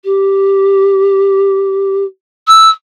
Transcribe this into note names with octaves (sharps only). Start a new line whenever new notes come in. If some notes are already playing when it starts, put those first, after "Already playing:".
G4
E6